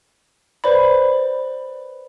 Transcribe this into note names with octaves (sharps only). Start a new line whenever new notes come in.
B4 C5 D5 B5